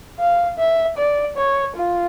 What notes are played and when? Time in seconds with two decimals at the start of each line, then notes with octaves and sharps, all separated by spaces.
0.19 F5
0.58 E5
0.97 D5
1.37 C#5
1.76 F4